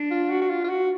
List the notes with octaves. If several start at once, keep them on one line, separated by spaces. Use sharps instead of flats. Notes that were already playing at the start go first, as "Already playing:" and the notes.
Already playing: D4
F4
F#4
F#4
F4
F4
F#4